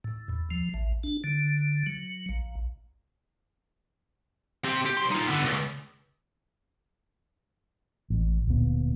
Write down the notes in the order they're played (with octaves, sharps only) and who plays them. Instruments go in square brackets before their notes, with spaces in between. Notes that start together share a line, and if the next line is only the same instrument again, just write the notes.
[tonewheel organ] A2
E2
F3
A1
D4
D3
F#3
A#1
[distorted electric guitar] C4 G4
G4
B1 C6
D#4 F4
D3 B3
C#2
[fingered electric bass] A1
D1 A#2 B3